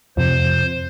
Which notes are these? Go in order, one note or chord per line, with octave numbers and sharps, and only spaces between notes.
F2 C3 F3 C5